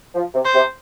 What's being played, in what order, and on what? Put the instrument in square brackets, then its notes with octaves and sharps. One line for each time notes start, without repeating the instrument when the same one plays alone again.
[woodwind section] F3
C3
[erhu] C5
[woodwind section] C3